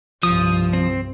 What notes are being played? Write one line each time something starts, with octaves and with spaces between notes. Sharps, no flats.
C2 G2 F3 D#6
C4